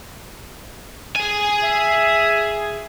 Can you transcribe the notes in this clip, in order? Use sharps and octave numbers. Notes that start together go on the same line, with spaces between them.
G#4 G#5
E5